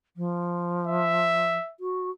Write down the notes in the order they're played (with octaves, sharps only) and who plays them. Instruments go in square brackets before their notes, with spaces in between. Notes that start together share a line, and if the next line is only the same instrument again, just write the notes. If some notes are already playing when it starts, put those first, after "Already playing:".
[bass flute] F3
[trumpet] E5
[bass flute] F#4